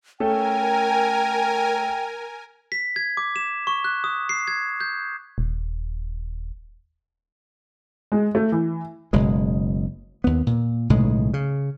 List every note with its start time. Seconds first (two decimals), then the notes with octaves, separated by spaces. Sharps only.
0.20 A3 C#4 A4 A#4 G5 G#5
2.72 B6
2.96 G#6
3.17 D6
3.36 E7
3.67 C#6
3.84 F#6
4.04 D#6
4.29 C7
4.48 G#6
4.80 G6
5.38 D#1
8.12 G#3
8.35 A3
8.52 E3
9.13 F#1 B2 G#3
10.24 D#2 B3
10.47 A#2
10.90 B1 A2 C#3 G#3
11.34 C#3